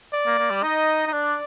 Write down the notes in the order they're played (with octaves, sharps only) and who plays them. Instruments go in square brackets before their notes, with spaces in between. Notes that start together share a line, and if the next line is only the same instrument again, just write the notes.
[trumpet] D5
[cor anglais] A#3
A#3
G3
[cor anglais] D#4 [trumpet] D#5
[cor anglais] D#4
[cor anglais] D4 [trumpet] D5